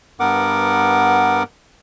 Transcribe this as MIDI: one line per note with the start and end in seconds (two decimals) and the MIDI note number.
0.20 1.43 43
0.20 1.43 59
0.20 1.43 70
0.20 1.43 78
0.20 1.43 86